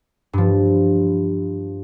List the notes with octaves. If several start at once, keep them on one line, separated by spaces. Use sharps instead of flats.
G2 F3